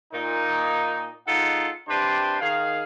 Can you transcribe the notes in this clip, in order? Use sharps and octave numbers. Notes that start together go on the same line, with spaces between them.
A#2 D#4
G#3 D#4 F4 A4 F#5
C3 D4 G4 B4 C5 C6
D#3 G#4 F5